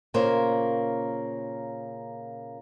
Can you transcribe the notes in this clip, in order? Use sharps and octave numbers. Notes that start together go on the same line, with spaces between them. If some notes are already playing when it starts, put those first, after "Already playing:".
A#2 C#3 A#3 C5 C#5